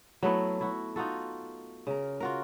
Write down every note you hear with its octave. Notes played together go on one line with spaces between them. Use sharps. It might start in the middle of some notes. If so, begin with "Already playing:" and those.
F#3 A3 B3 E4
E4 F#4
D#4 F4 F#4 A4
C#3 A#4
F4 F#4 A#4